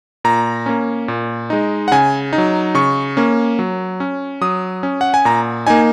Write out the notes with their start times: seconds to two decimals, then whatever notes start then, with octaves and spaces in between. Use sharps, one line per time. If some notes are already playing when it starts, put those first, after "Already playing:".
0.24 A#2 A#5
0.66 A#3 C#4
1.08 A#2
1.50 G#3 D#4
1.88 F#5
1.92 C#3 G#5
2.33 D#4
2.38 F#3
2.75 C#3 C#6
3.17 A#3 C#4
3.59 F#3
4.00 C#4
4.41 F#3 D#6
4.83 C#4
5.01 F#5
5.14 G#5
5.25 A#2 A#5
5.67 A#3 D#4 G#5